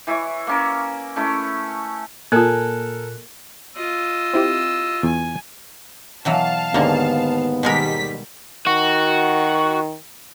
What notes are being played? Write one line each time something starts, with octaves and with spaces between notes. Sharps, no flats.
E3 E4 C#5
A#3 C#4 A#4
A3 C#4 E4
A#2 A#3 F4 A4 A#4 G#5 F#6
F4 D#5 E6
C4 E4 G4
E2 G#5
B2 E3 F#3 F5 A5
D#2 G#2 D3 A#3 B3
B2 D#3 G3 G#3 A#4 B6
D#3 F#4